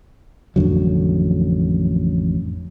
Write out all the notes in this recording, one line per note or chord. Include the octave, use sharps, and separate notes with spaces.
A1 F2 D3 F#3